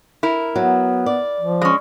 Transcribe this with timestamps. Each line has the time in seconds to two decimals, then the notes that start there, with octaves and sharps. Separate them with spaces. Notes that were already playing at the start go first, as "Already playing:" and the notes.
0.23 E4 A#4
0.56 F#3 B3
1.06 D5
1.41 F3
1.62 G#3 C#4